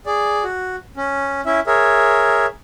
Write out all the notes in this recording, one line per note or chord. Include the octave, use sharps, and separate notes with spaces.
G#4 D5
F#4
C#4
C#4 E4 E5
G#4 A#4 C#5 E5